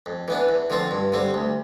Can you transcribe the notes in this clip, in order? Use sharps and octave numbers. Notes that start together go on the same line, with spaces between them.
F2
E3 B3 D4
E2
D3 F3 C4 F4
G2
D3 G3 C4
D2